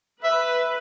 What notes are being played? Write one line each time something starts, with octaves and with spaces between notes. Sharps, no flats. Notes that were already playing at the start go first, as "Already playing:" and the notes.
B4 E5